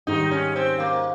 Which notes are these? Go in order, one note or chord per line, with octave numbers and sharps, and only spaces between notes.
G#2 D#3 G3 D#4
C#4
C4
A#3